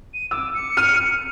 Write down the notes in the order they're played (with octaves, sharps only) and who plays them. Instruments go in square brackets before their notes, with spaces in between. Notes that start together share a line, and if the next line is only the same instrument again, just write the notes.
[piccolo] D#7
[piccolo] D6 [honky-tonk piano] E6
[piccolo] C#7
[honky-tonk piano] F6 D#7